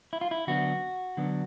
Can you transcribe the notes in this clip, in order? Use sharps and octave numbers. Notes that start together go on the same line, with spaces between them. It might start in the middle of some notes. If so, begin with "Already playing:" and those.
E4
F4
E4
D3 F#3 B3 D4 F#4
D3 F#3 B3 D4